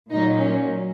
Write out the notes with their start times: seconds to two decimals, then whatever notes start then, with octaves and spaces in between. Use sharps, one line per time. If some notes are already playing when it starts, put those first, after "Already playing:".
0.11 A#2 F#3 D#4
0.39 C#4